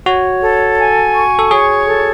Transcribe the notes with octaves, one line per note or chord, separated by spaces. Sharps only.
F#4 C#5
A4
G#5
C#6
A4
G#4 C#5
A4